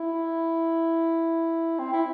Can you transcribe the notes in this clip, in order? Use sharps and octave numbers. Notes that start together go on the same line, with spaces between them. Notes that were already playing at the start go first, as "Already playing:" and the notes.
Already playing: E4
C4
E4